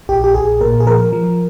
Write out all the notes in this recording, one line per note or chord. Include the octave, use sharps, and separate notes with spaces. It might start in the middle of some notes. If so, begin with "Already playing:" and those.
A#1 G4
G4
A#1 G#4
A#2 A#4
G#4
F3 A#4
F3